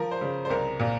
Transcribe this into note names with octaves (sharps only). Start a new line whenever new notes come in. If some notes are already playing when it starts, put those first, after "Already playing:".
Already playing: F3 A#4
C5
C#3
C5
C2 A#4
A#2